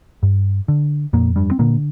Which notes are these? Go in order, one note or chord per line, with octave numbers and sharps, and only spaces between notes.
G2
D3
F2 A#2 A#3
G2 G3
C4
A#2 D3 A#3